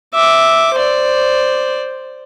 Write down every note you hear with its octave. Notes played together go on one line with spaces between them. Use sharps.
E5 D6
C5 D5